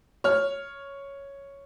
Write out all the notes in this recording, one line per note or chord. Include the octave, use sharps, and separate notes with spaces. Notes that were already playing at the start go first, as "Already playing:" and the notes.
C#5 F6